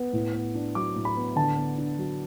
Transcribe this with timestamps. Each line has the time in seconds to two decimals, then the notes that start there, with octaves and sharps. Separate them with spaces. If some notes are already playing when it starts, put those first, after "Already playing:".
Already playing: B3
0.13 A2
0.34 B3
0.55 D4
0.75 F#3 D6
0.96 A2
1.05 B5
1.17 B3
1.36 D3 A5
1.57 B3
1.78 D4
1.98 F#3